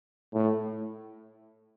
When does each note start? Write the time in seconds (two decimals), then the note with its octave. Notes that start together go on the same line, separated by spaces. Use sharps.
0.33 A2